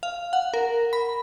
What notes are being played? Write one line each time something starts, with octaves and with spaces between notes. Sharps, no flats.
F5
F#5
A#4
B5